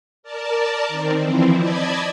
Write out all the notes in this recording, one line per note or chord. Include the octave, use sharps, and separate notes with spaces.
A#4 D5 A5
D#3 C4
E3 F3 C4 E4
D5 D#5 A5 B5 G#6